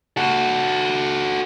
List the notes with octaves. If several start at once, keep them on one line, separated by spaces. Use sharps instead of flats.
F#4 A4